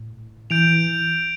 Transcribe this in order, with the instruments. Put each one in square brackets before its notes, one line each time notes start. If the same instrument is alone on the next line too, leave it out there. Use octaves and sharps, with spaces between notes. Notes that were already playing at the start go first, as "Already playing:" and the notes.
Already playing: [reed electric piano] A2
[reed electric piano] E3 [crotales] G6 D7 F7